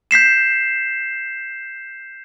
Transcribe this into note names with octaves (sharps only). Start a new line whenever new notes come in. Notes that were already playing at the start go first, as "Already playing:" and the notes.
G6 B6 C7 E7